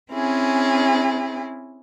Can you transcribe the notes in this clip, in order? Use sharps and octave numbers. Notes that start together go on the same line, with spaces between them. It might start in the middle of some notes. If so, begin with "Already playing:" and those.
C4 C#4 E4 G#4